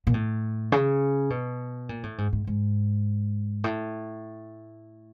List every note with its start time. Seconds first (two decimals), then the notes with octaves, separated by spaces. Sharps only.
0.07 A#2
0.14 A2
0.72 C#3
1.30 B2
1.89 A#2
2.03 A2
2.18 G#2
2.33 G#2
2.47 G#2
3.64 A2